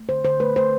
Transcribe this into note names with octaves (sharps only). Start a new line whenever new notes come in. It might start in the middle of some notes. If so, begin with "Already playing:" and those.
Already playing: A3
D3 C5
D3 C5
A3 B4
A3 C5